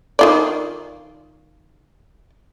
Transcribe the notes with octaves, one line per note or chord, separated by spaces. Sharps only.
D#3 F4 D5